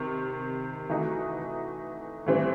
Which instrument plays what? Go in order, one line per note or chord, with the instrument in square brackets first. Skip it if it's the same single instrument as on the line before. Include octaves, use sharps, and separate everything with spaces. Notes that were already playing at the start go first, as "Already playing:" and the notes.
Already playing: [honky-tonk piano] C3 D#3
E3 A3 D#4 F#4
A2 E3 G3 C4